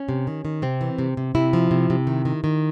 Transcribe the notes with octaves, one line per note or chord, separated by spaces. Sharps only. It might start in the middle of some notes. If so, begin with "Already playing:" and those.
Already playing: C#4
C3
D#3
D#3
C3 C4
E3
C3
C3
C3 E4
F3
C3
C3
D#3
D#3
D#3